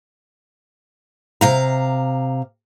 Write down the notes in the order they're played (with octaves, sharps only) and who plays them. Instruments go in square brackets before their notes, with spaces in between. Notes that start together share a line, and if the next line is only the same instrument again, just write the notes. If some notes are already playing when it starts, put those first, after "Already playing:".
[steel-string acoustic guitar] C3 F5 A#5